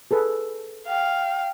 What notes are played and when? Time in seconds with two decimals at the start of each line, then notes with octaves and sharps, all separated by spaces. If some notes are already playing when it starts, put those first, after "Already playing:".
0.11 G#4 A4 B4
0.88 F5 G5